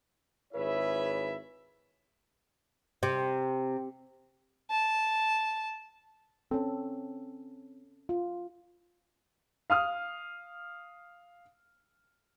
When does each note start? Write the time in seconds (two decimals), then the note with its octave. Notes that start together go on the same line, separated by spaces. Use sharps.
0.53 G#1 E4 G#4 B4 C#5 E5
3.03 C3
4.70 A5
6.51 C4 C#4 A4
8.09 F4
9.70 F5 D#6 F6